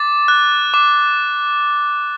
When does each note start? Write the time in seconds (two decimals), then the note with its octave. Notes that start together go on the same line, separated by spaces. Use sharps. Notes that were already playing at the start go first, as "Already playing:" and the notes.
Already playing: D6 A6
0.28 F#6
0.74 D6